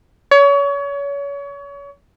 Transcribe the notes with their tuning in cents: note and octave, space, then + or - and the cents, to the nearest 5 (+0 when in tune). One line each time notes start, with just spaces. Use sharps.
C#5 +30